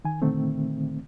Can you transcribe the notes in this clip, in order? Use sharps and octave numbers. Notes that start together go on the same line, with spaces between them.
D#3 G#5
A#2 D3 D#3 A3 C4